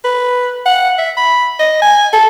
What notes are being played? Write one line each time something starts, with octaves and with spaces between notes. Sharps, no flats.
B4
F#5
E5
B5
D#5
G#5
A4